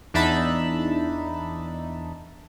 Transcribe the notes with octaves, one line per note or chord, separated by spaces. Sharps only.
E2 D4 D#4 E5 A5 B5